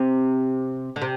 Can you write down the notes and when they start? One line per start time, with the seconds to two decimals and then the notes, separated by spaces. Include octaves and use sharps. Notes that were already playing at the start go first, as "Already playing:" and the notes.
Already playing: C3
0.96 D3
1.01 C3